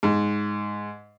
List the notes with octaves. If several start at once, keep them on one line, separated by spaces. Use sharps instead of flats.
G#2